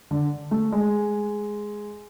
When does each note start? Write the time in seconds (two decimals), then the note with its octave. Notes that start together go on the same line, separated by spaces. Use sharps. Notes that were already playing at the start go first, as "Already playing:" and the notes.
0.11 D3
0.51 A3
0.72 G#3